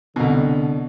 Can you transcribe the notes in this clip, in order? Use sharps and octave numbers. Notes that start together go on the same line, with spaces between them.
C2 B2 D3